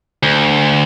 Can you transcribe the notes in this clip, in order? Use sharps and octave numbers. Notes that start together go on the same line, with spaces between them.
D2